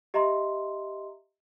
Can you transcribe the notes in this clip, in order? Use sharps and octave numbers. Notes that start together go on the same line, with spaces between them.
G4 D#5 E5 A#5 C6